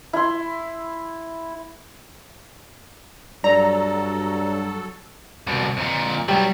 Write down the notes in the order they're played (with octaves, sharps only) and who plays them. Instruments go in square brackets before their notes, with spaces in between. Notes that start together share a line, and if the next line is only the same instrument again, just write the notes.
[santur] E4 C6
[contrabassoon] G2 [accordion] F#3 A4 [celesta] D5 [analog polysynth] A#5
[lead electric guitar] C2 B2
F2 A#2
[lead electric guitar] F#3 B3 [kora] G3